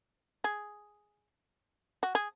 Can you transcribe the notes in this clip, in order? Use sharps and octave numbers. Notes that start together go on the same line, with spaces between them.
G#4
F#4
G#4